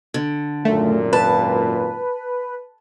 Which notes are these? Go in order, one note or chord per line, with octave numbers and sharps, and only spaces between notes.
D3
G#1 F#2 A#2 A3
B4 A5